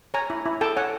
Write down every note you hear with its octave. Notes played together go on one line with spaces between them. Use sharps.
C#5 G#5 A#5
E4
E4
A4 G5 A5
C#5 F#5 G#5